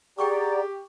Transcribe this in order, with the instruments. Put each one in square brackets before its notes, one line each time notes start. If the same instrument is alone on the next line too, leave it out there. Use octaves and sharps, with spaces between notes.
[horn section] G4 [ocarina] G#4 [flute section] D5 F#5 A#5 [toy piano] G5 C#6 D6